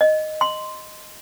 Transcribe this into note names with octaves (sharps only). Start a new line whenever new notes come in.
D#5
C6